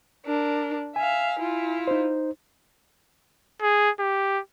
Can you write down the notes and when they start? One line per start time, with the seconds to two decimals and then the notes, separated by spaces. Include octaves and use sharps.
0.26 D4 A#4
0.96 E5 F5 G#5
1.39 E4 F4
1.87 D#4 C5
3.62 G#4
4.00 G4